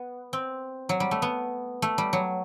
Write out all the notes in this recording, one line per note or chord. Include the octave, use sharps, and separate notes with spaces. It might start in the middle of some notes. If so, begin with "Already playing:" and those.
Already playing: B3
C4
F#3
G3
A3
B3
A3
G3
F#3